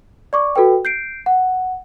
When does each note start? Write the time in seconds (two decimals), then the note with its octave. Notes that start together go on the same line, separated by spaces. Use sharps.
0.33 D5 C#6 D6
0.56 F#4 A4 B4 G5
0.85 G6 C7 D7
1.26 F#5